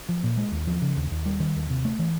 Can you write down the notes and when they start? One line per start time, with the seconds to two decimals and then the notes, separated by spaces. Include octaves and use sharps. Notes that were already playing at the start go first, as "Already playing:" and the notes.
0.09 F3
0.23 A#2
0.37 G#3
0.52 D#2
0.67 F3
0.82 C#3
0.97 D#2
1.11 D#2
1.26 G3
1.40 D#3
1.55 D#2
1.70 C3
1.85 A3
1.99 E3